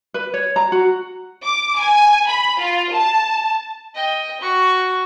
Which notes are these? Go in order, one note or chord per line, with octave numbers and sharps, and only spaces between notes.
B4
C#5
A#5
F#4
D6
G#5
B5
F4
A5
D#5 G5
F#4 C#6